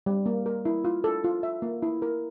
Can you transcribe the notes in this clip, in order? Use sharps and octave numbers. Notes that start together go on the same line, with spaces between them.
G3
A#3
A#4
E4
F4
A4
F4
E5
A#3
E4
A#4